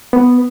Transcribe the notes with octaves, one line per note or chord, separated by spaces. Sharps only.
B3